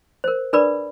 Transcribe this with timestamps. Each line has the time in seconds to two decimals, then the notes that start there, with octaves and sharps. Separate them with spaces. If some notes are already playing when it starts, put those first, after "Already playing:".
0.24 A#4 C5
0.53 D4 G#4 A#4 B4 D5 B5